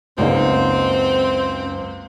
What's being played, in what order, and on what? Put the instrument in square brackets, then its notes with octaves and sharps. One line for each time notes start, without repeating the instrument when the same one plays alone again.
[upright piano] C#2 F5 [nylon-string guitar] F#2 A#3 D#4 [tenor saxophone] C4